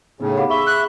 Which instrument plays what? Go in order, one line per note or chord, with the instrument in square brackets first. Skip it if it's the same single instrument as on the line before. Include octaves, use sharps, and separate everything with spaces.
[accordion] A2 C#3 [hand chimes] B3 D#4
[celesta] G4 F5 F#5 [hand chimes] B5 D6
[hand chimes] G#4 [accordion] E5 [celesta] B5 C#6 G7
[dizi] F#6